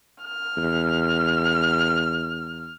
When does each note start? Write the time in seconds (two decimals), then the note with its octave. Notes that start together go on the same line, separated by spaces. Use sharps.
0.24 F6
0.57 E2